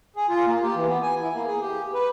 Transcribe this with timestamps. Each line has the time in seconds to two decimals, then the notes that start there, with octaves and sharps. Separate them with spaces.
0.16 G#4
0.29 F4
0.46 A#3
0.62 G4
0.75 E3
0.87 B3
1.03 G#5
1.20 E4
1.34 A#3
1.47 G#4
1.61 G4
1.94 B4